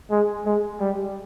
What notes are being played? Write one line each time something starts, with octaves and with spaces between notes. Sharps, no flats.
G#3
G#3
G3